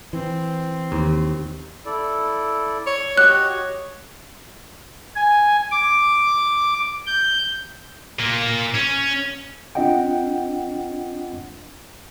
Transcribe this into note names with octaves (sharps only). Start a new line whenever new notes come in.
E3 C4
D#2
E4 A4 D5
C#5
F#4 G4 C#5 D#5 F#6
G#5
D6
G6
A#2 A#3
C#4
C4 D4 F4 D#5 F#5 G5